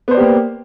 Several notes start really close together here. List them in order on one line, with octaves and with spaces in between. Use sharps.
B3 C5 D5 G4 A#3